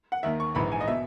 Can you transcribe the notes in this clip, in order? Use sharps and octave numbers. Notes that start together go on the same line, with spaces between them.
F#5
D#2 D#3 E5
C#6
A#1 G#2 E3 B5
G#5
D#5
B2 E5